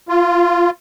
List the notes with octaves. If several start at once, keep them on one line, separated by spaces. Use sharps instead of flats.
F4